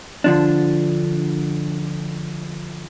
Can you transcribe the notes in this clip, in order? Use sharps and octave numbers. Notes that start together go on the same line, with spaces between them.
D3 F3 D4